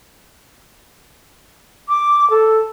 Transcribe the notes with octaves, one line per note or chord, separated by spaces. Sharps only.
D6
A4